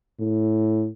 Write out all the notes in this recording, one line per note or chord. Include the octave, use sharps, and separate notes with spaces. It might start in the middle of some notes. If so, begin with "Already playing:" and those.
A2